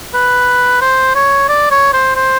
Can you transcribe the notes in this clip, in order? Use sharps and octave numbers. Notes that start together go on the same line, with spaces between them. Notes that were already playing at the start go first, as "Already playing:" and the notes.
B4
C5
C#5
D5
C#5
C5
C5